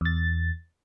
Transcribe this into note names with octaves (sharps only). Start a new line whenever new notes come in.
E2 A6